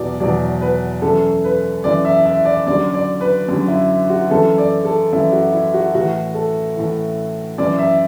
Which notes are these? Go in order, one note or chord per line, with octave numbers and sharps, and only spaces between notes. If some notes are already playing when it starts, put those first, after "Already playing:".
Already playing: E2 B2 F#3 D5
E2 B2 F#3 D5
B4
F#2 E3 A4
B4
F#2 E3 D5
E5
E5
D5
F#2 D3 F#3 D5
D5
B4
F#2 D3 F#3
E4
F#4
F#2 E3 A4
D5
A4
F#2 E3 E4
F#4
E4
F#4
A2 E3 F#4
A4
A2 E3
F#2 E3 D5
E5